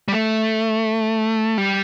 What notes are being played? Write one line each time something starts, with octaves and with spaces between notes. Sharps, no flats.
G3
A3
G3